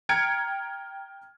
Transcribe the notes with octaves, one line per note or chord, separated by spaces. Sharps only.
G5 A#5 F6 G#6 C#7 D7